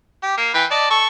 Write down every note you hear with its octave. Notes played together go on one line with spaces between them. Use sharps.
G4
A#3
E3 B4 G5
D5 D#5 A5
A4 C#6